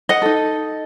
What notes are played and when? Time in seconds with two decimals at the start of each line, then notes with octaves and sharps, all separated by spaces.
0.09 D#5 F#5
0.22 D#4 A4